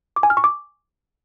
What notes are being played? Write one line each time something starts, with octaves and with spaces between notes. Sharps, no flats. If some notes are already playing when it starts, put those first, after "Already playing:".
D6
G#5
F6
C#6
D6